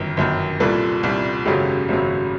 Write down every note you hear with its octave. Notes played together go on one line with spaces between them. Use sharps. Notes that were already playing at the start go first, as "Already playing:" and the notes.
Already playing: G1 F#2 D#3 A#4
G1 F#2 D#3
C2 A#2 G3 A4 B4
C2 A#2 G3
G#1 F#2 C#3 F#3 G4 A4
G#1 F#2 C#3 F#3